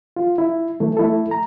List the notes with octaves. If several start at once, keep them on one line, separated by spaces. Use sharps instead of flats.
F4
E4
E3 A3
A3 E4 A4
A#5